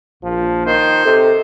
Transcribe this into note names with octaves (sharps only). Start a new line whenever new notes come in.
A#1 F3
D#3 C5
C3 A4